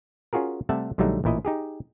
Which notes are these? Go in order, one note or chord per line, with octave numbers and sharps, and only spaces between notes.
C#4 F4 F#4 G#4 A#4
C3 G3 A3 E5 F#5 A5
A#1 D3 F#3 G3 A3 D#4
A1 A#2 E4 D#5
D#4 G4 G#4